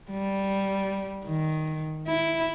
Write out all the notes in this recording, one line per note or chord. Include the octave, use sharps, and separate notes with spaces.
G3
D#3
E4